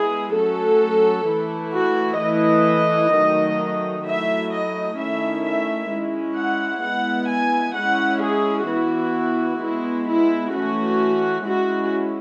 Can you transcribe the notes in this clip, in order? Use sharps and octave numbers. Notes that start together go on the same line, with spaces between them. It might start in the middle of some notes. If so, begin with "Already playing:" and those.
Already playing: G#3 B3 E4 G#4
F#3 A3 C#4 A4
E3 A3 E4
F#4
E3 A3 E4 D#5
D#3 F#3 A3 D#4
F#3 A3 E4 E5
D#5
D#3 A3 C#4 E4 E5
E5
G#3 C#4 E4
F#5
G#3 B3 E4 F#5
G#5
G#3 C#4 E4 F#5
G#4
E3 B3 E4 F#4
G#3 B3 E4
E4
E3 A3 C#4 F#4
G#3 C#4 E4 F#4